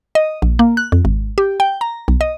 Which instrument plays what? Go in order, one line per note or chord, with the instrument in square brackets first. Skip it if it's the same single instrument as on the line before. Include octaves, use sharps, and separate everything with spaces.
[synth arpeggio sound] D#5
A#1
A#3
F#6
F2
G#1
G4
G5
A#5
B1
D#5